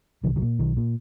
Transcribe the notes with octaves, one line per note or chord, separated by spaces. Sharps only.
B1 D3 F3
D#3 F#3
A#2
B1 D#3
A#2